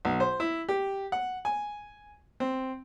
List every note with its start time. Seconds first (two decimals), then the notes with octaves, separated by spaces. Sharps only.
0.05 B1
0.20 C5
0.40 E4
0.69 G4
1.12 F#5
1.45 G#5
2.40 C4